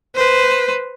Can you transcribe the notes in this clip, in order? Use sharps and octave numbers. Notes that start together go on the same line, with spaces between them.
B4 C5